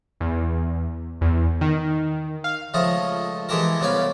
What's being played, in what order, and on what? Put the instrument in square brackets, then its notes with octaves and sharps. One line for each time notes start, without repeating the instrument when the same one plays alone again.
[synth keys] E2
E2
D#3
F5
[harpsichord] C#2 F3 A3 D#5
E3 G#3 G4 A4 A#4
C2 B3 C#4 D5 F5 B5